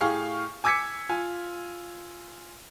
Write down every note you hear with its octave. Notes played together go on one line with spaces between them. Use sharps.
A2 G4 G#4 F5 G5 C#6
G#5 D6 E6 G#6 B6 C#7
F4 G#5